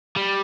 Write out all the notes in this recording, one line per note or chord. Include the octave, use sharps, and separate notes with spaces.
G3